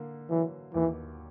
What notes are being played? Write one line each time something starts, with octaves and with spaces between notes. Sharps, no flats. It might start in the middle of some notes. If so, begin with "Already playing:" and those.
Already playing: D3 A#3
E3 F#3
D#2 E3